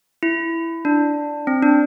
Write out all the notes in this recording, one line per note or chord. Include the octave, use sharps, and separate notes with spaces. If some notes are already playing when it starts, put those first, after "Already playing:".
E4
D4
C4
D4